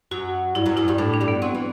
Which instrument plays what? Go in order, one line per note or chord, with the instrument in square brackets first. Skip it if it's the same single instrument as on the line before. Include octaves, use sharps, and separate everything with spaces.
[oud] F#2 F#3 [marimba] F#4
[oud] G2 G3 [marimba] E4
[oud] F#2 F#3
[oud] F#2 F#3 [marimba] E4
[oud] G2 G3
[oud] A2 A3 [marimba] D4
[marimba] D4
[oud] G2 G3
[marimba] B3
[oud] F#3 [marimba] C4
[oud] E3